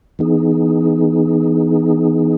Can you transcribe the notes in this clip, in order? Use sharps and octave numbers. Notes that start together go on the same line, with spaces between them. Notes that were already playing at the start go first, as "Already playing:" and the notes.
E3 B3 D#4 G#4